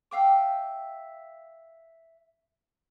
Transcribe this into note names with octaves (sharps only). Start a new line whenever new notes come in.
E5 F5 G5 D6